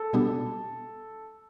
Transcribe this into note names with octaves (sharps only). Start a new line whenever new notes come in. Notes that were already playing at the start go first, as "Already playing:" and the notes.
Already playing: A4
B2 G3 B3 D4 G4